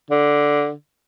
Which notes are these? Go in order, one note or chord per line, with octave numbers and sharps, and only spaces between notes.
D3